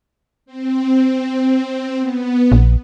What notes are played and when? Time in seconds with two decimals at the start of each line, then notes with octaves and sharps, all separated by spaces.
0.46 C4
2.00 B3
2.52 A#1